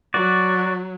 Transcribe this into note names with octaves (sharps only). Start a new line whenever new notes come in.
F#3 F#4 D5